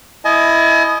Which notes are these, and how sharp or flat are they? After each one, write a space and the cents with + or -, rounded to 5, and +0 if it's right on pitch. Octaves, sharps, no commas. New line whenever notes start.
E4 +0 D#5 +0 G#5 +40